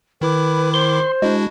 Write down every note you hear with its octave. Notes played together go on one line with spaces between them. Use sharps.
D#3 E4 B4 D6
C5 C6
G#3 D4 E4 F#4